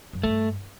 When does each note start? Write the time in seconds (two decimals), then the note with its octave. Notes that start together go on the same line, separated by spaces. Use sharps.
0.13 F#2
0.23 G2 A3